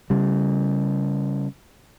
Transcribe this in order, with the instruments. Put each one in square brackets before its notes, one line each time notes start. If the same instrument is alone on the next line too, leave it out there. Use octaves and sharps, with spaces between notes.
[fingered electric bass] C#3 G3